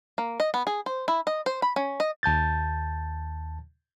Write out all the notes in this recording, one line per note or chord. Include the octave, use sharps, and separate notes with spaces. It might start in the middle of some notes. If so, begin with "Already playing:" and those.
A#3
D#5
B3
G#4
C5
E4
D#5
C5
B5
C#4
D#5
D#2 A5 G6 A6